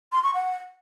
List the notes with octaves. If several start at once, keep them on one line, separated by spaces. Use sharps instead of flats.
C6
C#6
F#5